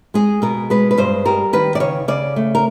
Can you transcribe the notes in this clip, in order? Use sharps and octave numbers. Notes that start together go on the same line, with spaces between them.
G#3 G#4
B2 A#4
G#3 B4
B4
G2 C5
G3 A#4
D#3 B4
D5
C#3 C#5
C#3 D5
A3
A#4